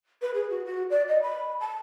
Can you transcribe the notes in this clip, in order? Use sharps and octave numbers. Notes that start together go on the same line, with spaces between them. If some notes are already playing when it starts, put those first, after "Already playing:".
B4
G#4
F#4
F#4
D5
D#5
B5
A5